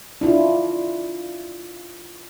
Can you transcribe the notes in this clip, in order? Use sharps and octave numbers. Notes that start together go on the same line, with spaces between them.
D4 E4 F4